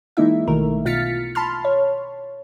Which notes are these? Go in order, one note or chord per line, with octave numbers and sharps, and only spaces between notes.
E3 G#3 A#3 D#4 E4 E5
B1 D#3 A3 A#4
B2 F4 F6 A6 B6 C#7
A5 B5 C6 F6
C#5